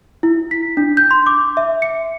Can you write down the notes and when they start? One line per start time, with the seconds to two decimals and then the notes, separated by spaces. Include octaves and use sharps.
0.23 E4
0.51 B6
0.77 D4
0.97 G6
1.11 C6
1.26 D6
1.57 E5
1.82 C#7